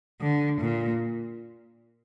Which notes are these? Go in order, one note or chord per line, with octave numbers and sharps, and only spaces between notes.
D3
A#2